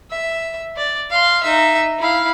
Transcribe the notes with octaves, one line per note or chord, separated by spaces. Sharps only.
E5
D5
F5 C6
D#4 E5
E4 F5